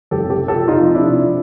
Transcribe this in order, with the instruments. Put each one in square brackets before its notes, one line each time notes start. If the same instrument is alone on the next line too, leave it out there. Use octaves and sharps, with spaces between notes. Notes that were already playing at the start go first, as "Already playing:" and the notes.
[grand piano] F#1 G4 A4
C3 G4 A4
C3
G4 A4
F3
F2 D#4 F4
F3
C3 D4 E4
C3
F3